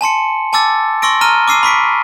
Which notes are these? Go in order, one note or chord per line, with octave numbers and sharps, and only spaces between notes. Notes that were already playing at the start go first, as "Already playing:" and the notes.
G#5 A5 C6 C#7
G#5 A5 D6 E6 A6
C6 C#6 E6 A#6 D7
A#5 F6 D#7 G7
D6 E6 C7 D#7
B5 C#6 B6 D7